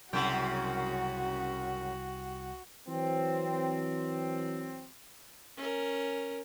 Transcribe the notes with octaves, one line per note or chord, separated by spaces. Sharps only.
C2 F#2 C#3 F#4 G5
E3 F#3 C4
C#4 A#4